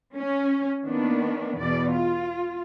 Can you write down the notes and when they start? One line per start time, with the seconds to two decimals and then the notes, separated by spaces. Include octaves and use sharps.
0.15 C#4
0.85 D#3 A#3 B3 D4
1.57 E2 B2 D5
1.90 F4